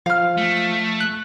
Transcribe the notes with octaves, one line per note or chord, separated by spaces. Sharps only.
F3 F5 F6
A3
F#6